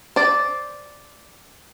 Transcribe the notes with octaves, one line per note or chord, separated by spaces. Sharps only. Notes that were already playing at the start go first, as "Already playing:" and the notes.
C5 D5